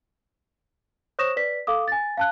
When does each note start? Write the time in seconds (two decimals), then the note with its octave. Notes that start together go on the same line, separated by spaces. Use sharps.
1.19 C5 C#5 C#6 D#6 A#6 E7
1.37 B4 D5 B6
1.67 A4 F5 D6 D#6
1.88 G#5 A6
2.17 F5 A5 F#6